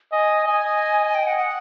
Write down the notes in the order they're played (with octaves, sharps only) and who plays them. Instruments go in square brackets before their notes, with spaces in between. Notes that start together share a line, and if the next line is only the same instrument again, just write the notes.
[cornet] D#5 [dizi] G#5
[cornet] D#5 [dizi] G#5
[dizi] G5
F#5
F#5